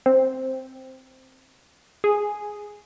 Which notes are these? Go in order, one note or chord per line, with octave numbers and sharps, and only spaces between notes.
C4
G#4